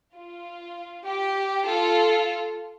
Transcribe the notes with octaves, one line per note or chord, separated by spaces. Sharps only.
F4
G4
F4 A4